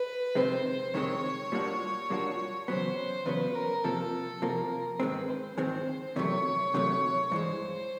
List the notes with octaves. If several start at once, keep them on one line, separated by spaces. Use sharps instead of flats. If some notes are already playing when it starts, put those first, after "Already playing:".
Already playing: B4
F2 C3 D#3 G#3 C4 C5
F2 C3 D#3 G#3 C4 C#5
A#2 G3 A#3 D4 F#4
A#2 G3 A#3 D4 F#4
E2 C#3 F#3 B3 C5
E2 C#3 F#3 B3 B4
A#4
F2 C3 F3 A#3 A4
F2 C3 F3 A#3 A#4
G#2 D#3 G#3 C4 B4
C5
G#2 D#3 G#3 C4 C5
E2 C3 D#3 F#3 A3 C#5
E2 C3 D#3 F#3 A3
G2 E3 G#3 C5